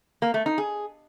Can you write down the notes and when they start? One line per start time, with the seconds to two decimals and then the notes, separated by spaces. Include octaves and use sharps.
0.22 A#3
0.34 A3
0.46 D#4
0.58 G#4